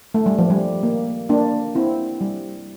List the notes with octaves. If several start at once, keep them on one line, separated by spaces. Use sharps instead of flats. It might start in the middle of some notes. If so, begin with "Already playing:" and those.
A3
G3
F3
G3
A#3
A#3 D4
C4 E4
G3